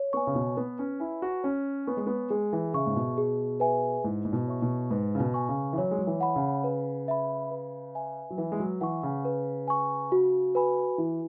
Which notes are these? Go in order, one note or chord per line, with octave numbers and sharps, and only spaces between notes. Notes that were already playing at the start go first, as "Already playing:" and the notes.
Already playing: C#5
B3 G#5 C#6
C#3
B2
B3 B4
C#4
E4 G#5 B5
F#4
C#4 C#5
B3 G#5 C#6
G#3
B3
G#3 G#4
E3
C#3 E5 C#6
G#2
B2
G#4
B4 E5 G#5
G#2 E4
G#2
B2
C#5 E5 C#6
B2
G#2 B4
C#3
B2
G#5 C#6
C#3
E3
F#3 C#5
G#3
F#3
E3
F#5 B5
C#3
B4
E5 B5
B4
E5 G#5
F#3
E3 B4
G#3
F#3
E3 F#5 C#6
C#3
B4
G#5 C#6
F#4
B4 G#5 B5
E3 E4